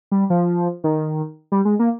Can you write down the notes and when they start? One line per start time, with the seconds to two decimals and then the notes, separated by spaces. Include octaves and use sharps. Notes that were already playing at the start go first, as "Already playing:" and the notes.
0.12 G3
0.30 F3
0.84 D#3
1.52 G3
1.65 G#3
1.79 A#3